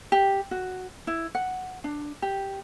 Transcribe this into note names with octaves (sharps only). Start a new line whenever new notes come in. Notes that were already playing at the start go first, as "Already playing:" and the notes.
G4
F#4
E4
F#5
D4
G4